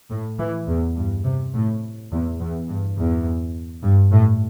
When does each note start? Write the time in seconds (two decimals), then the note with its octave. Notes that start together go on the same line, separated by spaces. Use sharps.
0.10 A2
0.39 E3
0.67 E2
0.96 G2
1.24 C3
1.54 A2
2.11 E2
2.39 E2
2.69 G2
2.98 E2
3.83 G2
4.12 A2